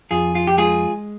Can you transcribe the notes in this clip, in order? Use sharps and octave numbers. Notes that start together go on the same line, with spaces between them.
F2 F4 G#4
F4
G4
G#3 F4 G#4